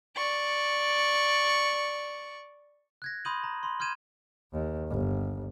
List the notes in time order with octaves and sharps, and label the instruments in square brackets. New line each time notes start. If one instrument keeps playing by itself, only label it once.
[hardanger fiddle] D5 C#6
[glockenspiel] F#6 G#6 A#6
B5 C6 D#6 G6 D#7 F#7
A#5
B5 C6
C6 F6 G6 G#6 D#7 E7
[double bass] D#2
G1